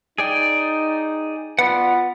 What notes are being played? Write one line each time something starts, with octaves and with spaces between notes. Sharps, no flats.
D#4 G#4 D5 G5
B3 F4 D5 F#5